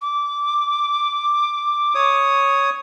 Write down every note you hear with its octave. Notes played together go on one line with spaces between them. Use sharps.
D6
C#5 D#6